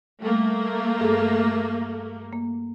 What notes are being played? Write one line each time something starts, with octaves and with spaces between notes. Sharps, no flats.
G3 A3 A#3
G2 G#4 A4
A#3